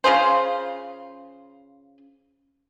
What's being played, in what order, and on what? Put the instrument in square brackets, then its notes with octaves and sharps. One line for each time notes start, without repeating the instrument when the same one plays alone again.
[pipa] C#3 F4 G#4 C5